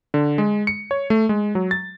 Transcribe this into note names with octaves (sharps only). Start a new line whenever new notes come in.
D3
G#3
C#7
C#5
A3
G#3
F#3
A6